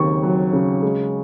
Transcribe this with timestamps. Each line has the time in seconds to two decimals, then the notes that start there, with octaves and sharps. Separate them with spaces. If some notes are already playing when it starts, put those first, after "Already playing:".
Already playing: D#2 C#3 F#3 C4 C#6
0.23 F#3
0.53 C#3
0.82 G#3